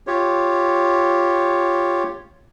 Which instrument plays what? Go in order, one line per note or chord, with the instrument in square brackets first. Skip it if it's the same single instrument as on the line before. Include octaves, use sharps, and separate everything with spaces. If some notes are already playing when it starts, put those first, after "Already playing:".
[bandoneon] F4 G4 C#5